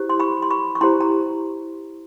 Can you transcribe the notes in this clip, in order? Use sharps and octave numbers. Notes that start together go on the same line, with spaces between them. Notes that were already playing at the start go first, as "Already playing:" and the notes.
Already playing: E4 G4 C5
C6
B5 C#6
C6
B5 C#6
C#6
E4 G4 C5 A#5 C6
A#5